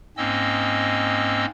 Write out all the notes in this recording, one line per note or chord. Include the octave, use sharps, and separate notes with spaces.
G#2 A#3 C4 C#4 D#5 E6